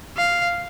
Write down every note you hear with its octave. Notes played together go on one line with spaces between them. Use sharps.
F5